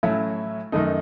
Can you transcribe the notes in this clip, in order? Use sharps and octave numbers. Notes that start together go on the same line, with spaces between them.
A2 F#3 A3 C#4 E4
F#2 D#3 A3 D#4